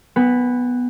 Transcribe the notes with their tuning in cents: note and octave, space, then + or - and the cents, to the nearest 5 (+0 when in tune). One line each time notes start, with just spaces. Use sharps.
B3 +0 G#5 -45 B5 +0